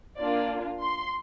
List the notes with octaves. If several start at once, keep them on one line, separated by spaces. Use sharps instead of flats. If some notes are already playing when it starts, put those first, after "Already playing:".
A#3 D4 F4 D5
C6